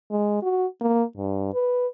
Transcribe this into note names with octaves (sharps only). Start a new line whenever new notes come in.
G#3
F#4
A#3
G2
B4